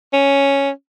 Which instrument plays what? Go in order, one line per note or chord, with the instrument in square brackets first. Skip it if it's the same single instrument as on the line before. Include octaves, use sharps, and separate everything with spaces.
[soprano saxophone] C#4